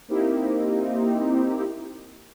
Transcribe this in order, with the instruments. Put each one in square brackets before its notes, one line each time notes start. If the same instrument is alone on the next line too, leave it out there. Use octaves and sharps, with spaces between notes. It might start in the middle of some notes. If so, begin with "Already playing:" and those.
[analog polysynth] A#3 C4 D#4 E4 G4